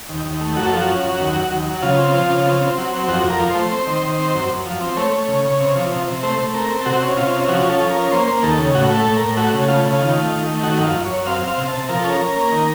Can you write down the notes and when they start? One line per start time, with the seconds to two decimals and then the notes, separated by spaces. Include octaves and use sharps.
0.09 D#2
0.26 D#2
0.41 A3
0.56 F#2 F#4
0.66 A4
0.73 F3 F#4
0.88 C#4
1.03 F#2
1.20 D#2
1.36 F#3
1.51 D#2
1.66 F#3
1.82 C#3 F4
1.99 C4
2.14 F3
2.30 C#3
2.46 C4
2.61 C4
2.77 F#3
2.93 C4
3.08 F2 F#4
3.23 F2
3.30 A#4
3.40 F3
3.50 A3 C5
3.72 C4
3.87 D#3
4.03 D#3
4.18 C4
4.35 F#2
4.49 F#2
4.66 F3
4.81 C4
4.96 A3 C#5
5.12 A3
5.28 C#3
5.44 C#3
5.60 C3
5.75 F3
5.91 C3
6.07 C3
6.23 A3 C5
6.39 A3
6.54 C4 A#4
6.70 C4
6.81 A4
6.86 C3 F#4
7.02 C#4
7.17 C3 F4
7.33 C#4
7.49 F3 F#4
7.64 C#4
7.69 A4
7.81 F3
7.90 A#4
7.96 C#4
8.11 A#3 C5
8.27 A#3
8.42 D#2 A4
8.58 C#3
8.75 A2 F#4
8.90 A3
8.95 A4
9.05 A2
9.16 A2 A#4
9.37 A3 F#4
9.53 C#3
9.68 A3 F4
9.85 C#3
9.93 F4
10.01 D#3
10.16 A3
10.32 D#3
10.47 A3
10.63 D#3 F#4
10.79 F#2
10.84 F4
10.95 F#2
11.05 F#2 C#5
11.26 C4 F5
11.42 C4
11.48 F5
11.57 C3
11.68 C3 A5
11.89 F3 A#4
11.99 C#4 A4
12.09 A#4
12.20 C#4
12.36 A#3
12.52 D#3